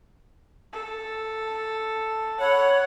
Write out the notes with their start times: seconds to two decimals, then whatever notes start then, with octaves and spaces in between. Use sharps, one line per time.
0.73 A4
2.41 C#5 F#5 B5